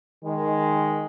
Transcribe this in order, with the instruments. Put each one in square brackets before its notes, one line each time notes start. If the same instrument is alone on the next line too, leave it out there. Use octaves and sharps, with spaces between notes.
[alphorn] D#3 [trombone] G#3